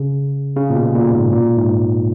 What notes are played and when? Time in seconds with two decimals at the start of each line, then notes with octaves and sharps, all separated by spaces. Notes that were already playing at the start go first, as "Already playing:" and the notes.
Already playing: C#3
0.57 C#3
0.70 A#2
0.76 B2
0.95 A#2
1.13 G#2
1.32 A#2
1.57 G#2